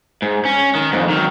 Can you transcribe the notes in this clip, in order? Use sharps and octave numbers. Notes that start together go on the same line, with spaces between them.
G#2
C#4
D#3
F2 G#2
D#3 F#3